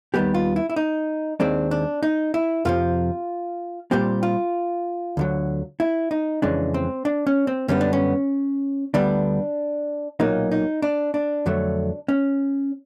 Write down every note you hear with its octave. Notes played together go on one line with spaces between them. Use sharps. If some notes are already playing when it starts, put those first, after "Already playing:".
D#2 D#3 G3 B3 G4
F4
E4
E4
D#4
D#2 D#3 G#3 C4 D4
D4
D#4
E4
F2 C3 F3 F4
A#2 G3 C4 G4
F4
D2 D3 F#3
E4
D#4
F2 C#3 E3 G#3 D4
C4
D4
C#4
C4
F#2 D3 G3 B3 C#4
D4
C#4
D2 D3 G3 B3 D4
B1 A#2 F#3 A#3 D#4
D#4
D4
D4
F2 D3 F#3 A3
C#4